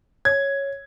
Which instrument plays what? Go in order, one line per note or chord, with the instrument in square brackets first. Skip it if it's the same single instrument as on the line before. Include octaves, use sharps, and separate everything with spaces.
[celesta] C#5 [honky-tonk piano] G#6